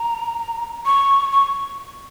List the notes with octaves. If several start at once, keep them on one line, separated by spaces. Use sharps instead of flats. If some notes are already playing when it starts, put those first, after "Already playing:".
Already playing: A#5
C#6
C#6